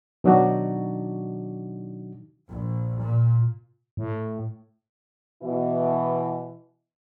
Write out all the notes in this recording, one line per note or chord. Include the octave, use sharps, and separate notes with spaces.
B2 D#3 F#3 D4 D#4 F#4
A#1
A#2
A2
B2 E3